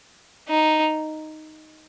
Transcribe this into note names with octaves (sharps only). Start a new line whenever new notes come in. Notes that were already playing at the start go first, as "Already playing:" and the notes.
D#4